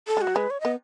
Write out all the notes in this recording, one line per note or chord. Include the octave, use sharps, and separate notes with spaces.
A4
G#3
F#4
F#3
G#3 B4
C#5
B3 D#5